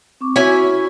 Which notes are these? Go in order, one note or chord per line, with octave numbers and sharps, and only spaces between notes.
C4 C#6 D6
C#4 E4 F#4 G#5